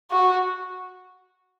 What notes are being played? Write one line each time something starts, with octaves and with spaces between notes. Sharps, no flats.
F#4